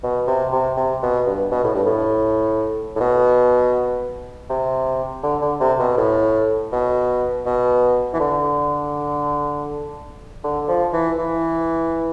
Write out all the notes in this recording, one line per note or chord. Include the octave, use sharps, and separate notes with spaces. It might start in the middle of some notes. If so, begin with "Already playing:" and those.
B2
C3
C3
C3
B2
G2
B2
A2
G2
A2
A2
B2
C3
D3
D3
C3
B2
A2
B2
B2
E3
D3
D3
F3
E3
E3